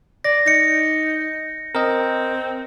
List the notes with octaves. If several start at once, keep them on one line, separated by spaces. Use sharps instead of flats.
D5 A#6
D#4 A#6 C#7
C4 A#4 D#5